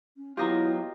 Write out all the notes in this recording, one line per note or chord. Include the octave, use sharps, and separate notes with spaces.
C#4
F#3 B3 E4 F4 G4 D#5 A#5